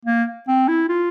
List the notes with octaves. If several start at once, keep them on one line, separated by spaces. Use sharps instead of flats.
A#3
C4
E4
F4